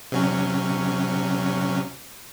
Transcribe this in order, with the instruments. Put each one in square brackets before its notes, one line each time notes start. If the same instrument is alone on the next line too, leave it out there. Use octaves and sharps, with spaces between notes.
[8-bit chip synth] C3 F#3 C#4